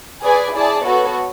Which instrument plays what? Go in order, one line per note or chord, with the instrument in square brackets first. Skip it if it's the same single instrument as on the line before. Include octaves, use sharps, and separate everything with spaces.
[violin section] G#4 B4 D5 G#5
E4 G#4 D5 A5
B3 F#4 A4 C#5